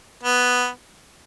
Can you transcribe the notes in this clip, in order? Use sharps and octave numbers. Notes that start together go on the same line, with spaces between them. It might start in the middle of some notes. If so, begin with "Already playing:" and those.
B3